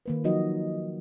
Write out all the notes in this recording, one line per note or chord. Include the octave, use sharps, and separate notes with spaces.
D#3 A#3 B4
F3 F#3 D#4 F#4 D#5